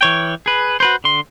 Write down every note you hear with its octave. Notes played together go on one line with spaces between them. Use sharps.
E3 C#5 G5
G#4 B4
F#4 B4 C5
D3 C6